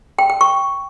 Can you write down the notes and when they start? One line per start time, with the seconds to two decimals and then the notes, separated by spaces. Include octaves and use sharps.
0.19 G5
0.30 G5
0.41 C#6